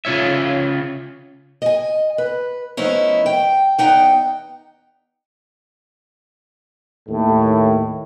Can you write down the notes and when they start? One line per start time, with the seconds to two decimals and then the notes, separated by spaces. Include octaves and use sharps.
0.05 C#3 F4 C#5 E5
1.62 D#5 G#5
2.18 B4
2.77 F3 A3 B3 C#4 D#4 E4
3.26 G5
3.78 E2 B3 D#4 F#5 G5
7.09 D#2 A2